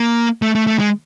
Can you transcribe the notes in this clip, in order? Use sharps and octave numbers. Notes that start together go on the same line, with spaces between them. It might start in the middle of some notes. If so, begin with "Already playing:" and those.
Already playing: A#3
A3
A3
A3
G#3